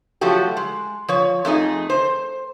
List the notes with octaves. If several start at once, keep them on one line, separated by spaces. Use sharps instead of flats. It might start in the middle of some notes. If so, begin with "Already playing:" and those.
F3 F#3 A3 F#4 G4
G#3
F3 C#5
F2 A3 D#4 G#4
C5